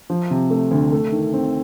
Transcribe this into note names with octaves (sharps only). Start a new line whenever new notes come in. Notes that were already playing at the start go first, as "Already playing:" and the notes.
F3
C3
A3
D2
A3
D#3
C4